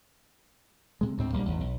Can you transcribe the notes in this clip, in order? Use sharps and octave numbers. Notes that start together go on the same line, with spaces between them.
C3 G#3
D2 G#2 C4
A#1 G3 A#3
G#1 E2
B1